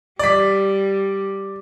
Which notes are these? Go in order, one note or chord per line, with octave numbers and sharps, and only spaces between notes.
G3 D5 B6